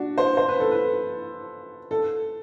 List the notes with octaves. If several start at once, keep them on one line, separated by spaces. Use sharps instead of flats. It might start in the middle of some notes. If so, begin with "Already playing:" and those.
Already playing: D4 F#4
C5
C5
B4
A4
B4
A4